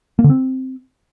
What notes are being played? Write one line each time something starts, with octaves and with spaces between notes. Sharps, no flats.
A#3
D3
C4